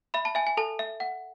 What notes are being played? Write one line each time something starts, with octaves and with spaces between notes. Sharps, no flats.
E5 B5
A5
E5 G#5
G#5
A4 A5
E5
F#5